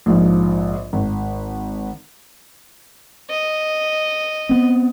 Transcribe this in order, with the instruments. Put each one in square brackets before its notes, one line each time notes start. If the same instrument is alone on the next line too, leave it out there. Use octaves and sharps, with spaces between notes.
[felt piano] A#1 G#2 F3
G#1
[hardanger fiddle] D#5
[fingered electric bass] B3 C4